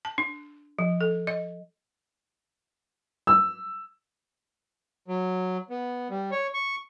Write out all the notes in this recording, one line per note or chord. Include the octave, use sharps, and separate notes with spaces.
A5
D4
F3
A4
D#5
E6
F#3
B3
G3
C#5
C#6